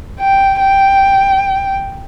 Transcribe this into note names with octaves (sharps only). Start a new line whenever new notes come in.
G5
G5